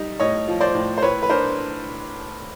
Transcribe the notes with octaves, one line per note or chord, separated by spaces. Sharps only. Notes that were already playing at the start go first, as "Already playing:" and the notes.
Already playing: G3 D#4
A2 C#5 D#5
F3
C5 D5
A2
C5
A2 B4 C#5
B4
D4 A#4 C5